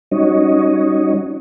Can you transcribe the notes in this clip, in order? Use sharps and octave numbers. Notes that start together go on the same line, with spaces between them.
G3 C#4 D#4 F#4 C#5 D#5